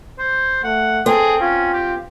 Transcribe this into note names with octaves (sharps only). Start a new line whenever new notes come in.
C5
A3 F#5
C4 G#4 A4
C#4 F4
G4